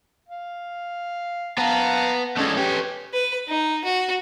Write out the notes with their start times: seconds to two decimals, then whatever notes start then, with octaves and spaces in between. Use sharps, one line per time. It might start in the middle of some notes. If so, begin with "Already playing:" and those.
0.29 F5
1.58 B3 F5 A5 A#5
2.38 G#3 A3 C#4 A4 D5
2.57 G4 B4 C#5 G#5
3.13 B4
3.48 D#4
3.84 F#4